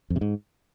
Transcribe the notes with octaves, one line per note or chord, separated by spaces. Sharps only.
F2
C3
G#2